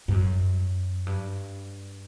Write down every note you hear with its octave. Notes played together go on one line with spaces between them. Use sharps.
G2
F#2
G2